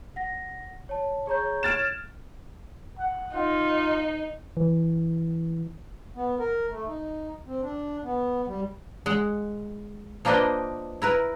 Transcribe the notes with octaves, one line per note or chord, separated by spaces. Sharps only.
F#5 A#6
C#5 A5
G#4 C#5 A#5 G6
F6 F#6 G#6 A6 D7 E7
F#5
D#4 F4
E3
B3
A#4
A3
D#4
C4
D4
B3
G3
G#3 F#5
F3 A#3 D4 B4 D#5 G5
E4 A#4 B4